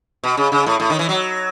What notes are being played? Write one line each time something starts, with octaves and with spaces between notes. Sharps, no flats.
B2
C#3
C#3
A2
A2
D#3
E3
F#3